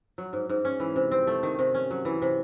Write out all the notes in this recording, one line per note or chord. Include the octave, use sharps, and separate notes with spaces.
F#3
G#2
G#2
C#4
E3
C3
C4
A3
D#3
C3
C#4
F#3
E3
C3